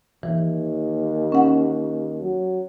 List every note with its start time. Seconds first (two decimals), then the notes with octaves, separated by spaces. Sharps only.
0.23 D#2 E3
1.32 C#4 F#5
2.22 F#3